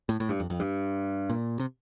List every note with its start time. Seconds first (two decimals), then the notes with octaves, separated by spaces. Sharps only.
0.09 A2
0.20 A2
0.29 G2
0.40 F2
0.50 F2
0.60 G2
1.30 A#2
1.59 C3